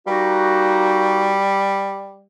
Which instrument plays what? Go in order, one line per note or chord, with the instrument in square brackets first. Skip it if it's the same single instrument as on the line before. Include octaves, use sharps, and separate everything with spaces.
[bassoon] G3 [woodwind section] A#3 D#4 F#4